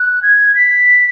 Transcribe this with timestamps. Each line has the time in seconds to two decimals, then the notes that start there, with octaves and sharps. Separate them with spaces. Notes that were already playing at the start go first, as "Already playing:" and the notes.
Already playing: F#6
0.23 G#6
0.55 B6